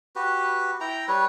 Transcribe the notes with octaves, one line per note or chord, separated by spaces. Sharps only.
F#4 G4 B4
E4 G5 A#5
G3 B4 C#5